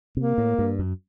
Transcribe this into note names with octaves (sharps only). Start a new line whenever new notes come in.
C3 A#3
A2
G2
F#2